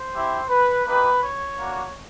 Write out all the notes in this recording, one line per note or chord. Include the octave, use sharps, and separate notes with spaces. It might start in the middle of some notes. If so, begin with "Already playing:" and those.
Already playing: C5
C4 E4 G4
B4
A#3 D#4 G4 B4
C#5
A#3 D4 F#4